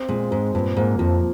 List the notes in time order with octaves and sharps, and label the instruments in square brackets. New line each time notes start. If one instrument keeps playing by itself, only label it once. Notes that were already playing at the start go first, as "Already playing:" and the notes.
Already playing: [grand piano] C4
[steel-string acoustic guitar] A#2 [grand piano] G#3
[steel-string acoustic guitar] G#2 [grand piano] C4
[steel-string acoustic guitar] G2 [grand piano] A#2
[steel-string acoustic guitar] G#2 [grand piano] A#3
[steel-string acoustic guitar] F2 [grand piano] F3